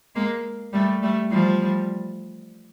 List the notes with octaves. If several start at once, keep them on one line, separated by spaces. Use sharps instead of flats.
G#3 A#3
G3 A3
G3 A3
F3 G3